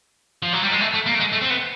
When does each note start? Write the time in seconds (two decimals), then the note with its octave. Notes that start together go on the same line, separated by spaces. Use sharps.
0.42 F3
0.53 F#3
0.62 G3
0.71 G#3
0.81 A3
0.94 A3
1.06 A#3
1.15 A3
1.20 G#3
1.33 A3
1.41 C4
1.50 B3